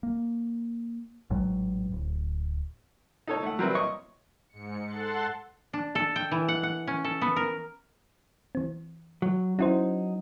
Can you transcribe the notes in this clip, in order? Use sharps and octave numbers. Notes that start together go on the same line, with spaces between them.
A#3
A1 G#2 F#3
D1
D#4 A4 C#5
A3 F#5
F#3 G3 C4 A#4 B4 E5
C#5 D#5 C#6
G#2 C#7
A4 F#5 C6 F#6 A6
D4
A4
G5
E3
F#5
F#5
C#4
A4
B3
A#4
E3 C4
F#3
F#3 C#4 D#4 E4 C5